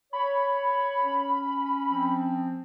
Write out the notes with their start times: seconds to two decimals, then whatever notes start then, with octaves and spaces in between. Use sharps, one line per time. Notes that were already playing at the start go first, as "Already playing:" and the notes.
0.13 C#5 B5
1.04 C#4
1.87 F3 C4